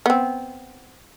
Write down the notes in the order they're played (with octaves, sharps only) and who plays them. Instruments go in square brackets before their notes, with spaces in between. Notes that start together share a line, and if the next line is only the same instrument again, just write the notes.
[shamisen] B3 C4